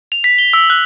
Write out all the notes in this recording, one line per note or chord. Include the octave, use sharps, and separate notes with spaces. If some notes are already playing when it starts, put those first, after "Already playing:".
F7
B6
G7
E6
F#6